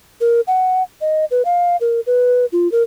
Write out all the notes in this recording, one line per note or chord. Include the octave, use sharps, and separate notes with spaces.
A#4
F#5
D#5
B4
F5
A#4
B4
F4
A#4